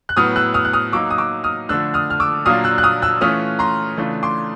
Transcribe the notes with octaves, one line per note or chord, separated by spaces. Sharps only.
F#6
A2 F#3 B3 D#6 F6
E6 F#6
D#6 F6
F#6
D#6 F6
F#3 A#3 D#4 D6 E6
D#6
D6 E6
D#6 F6
D3 F3 A3 D4 E6 F#6
D#6 F6
F6
D6 E6
A#2 F#3 A#3 D4 F4 D#6 F6
E6 F#6
F#6
D#6 F6
E6 F#6
E3 A3 C#4 F4 D#6 F6
A#5 C6
C#3 E3 A3 D4 F4
C6 D6